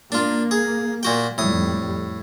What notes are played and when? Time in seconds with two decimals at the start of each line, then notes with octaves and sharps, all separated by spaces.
0.12 A#3 D4 F4
0.51 G#4
1.03 A#2 F#4 G5
1.38 F2 A2 G3 D#6